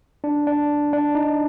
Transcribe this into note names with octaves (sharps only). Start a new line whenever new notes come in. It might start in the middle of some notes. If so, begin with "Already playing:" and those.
D4
D4
D4
D#4